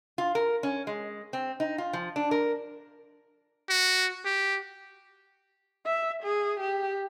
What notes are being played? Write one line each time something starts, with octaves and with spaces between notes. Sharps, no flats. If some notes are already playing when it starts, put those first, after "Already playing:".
F4
A#4
C#4
G#3
C4
D#4
F4
F3
D4
A#4
F#4
G4
E5
G#4
G4